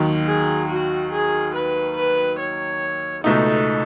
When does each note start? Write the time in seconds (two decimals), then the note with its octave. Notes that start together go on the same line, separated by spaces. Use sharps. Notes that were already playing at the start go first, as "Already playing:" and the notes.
Already playing: D#2 D#3 F#3
0.26 G#4
0.69 F#4
1.12 G#4
1.54 B4
1.96 B4
2.39 C#5
3.24 C#2 B2 A3 D#4 A4